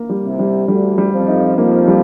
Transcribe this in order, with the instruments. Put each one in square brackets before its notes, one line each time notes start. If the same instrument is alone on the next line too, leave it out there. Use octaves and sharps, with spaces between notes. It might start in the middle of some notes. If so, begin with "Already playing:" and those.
Already playing: [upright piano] A#3 A#4
G3
[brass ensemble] C2 C3
[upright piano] G3
[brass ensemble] D2 D3 [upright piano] G3
[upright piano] G3
[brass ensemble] F2 F3
[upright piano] D#4
[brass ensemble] F2 F3 [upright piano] A#3
[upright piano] G3